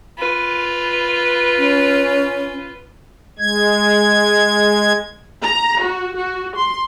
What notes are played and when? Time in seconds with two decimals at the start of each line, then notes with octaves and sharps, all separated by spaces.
0.18 F4 B4
1.58 C#4
3.39 G#3 G#6
5.43 A#5
5.81 F#4
6.15 F#4
6.56 C6